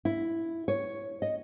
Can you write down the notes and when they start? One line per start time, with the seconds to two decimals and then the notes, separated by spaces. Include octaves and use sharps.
0.05 E4
0.68 C#5
1.22 D#5